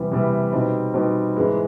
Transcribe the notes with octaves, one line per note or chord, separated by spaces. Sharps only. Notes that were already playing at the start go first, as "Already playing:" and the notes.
Already playing: E2 C3 E3 G3 B3
E2 C3 E3 G3 B3
B2 G3 C4 D#4
B2 G3 C4 D#4
G#2 E3 G#3 B3